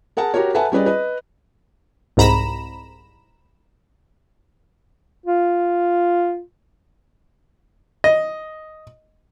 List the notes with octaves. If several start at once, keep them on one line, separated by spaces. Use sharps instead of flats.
G#4 A#4 F#5 A5
F#4 G4 A#4 C#5
A4 B4 E5 F#5 G#5 A5
G3 C#4 G#4 B4 D5 D#5
B4 D#5
C2 G#2 A#5 B5 E7
F4
D#5